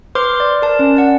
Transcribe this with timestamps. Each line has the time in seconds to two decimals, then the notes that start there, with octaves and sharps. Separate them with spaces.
0.15 B4 C5 C6 D6 F6
0.40 D5
0.62 A#4 A5
0.79 C#4
0.97 D5 F#5